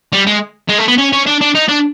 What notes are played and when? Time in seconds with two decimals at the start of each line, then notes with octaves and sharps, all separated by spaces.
0.13 G3
0.27 G#3
0.69 G#3
0.79 A3
0.88 B3
0.98 C#4
1.13 C#4
1.27 D4
1.41 D4
1.55 D#4
1.69 D4